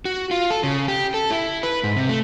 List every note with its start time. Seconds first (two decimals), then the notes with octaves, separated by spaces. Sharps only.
0.05 F#4
0.31 F4
0.50 A4
0.63 C#3
0.88 G4
1.14 A4
1.31 E4
1.63 B4
1.84 G#2
1.96 C3
2.09 A3